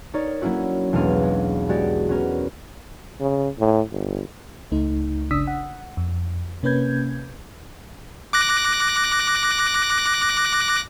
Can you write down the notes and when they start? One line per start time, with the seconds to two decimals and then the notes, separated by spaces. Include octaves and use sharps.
0.14 D#4 A#4 C#5 D5
0.41 F#3 A#3 C#4 E4 F#4
0.93 B1 E2 G#3 D4 F5 D#7
1.23 G#3
1.69 G#3 F#4 G4 D5
2.09 B3 C#4 A#4
3.21 C#3
3.60 A2
3.92 G1
4.72 C#2 A3 D#4
5.31 G1 C#3 D4 D#6 E6 B6
5.47 F#5
5.97 F2
6.63 C3 A#3 C#4 B4 G6 G#6
8.33 D6 F#6 A#6